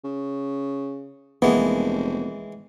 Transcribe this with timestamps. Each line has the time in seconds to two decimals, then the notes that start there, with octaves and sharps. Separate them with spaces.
0.05 C#3
1.42 F1 E3 G#3 A#3 B3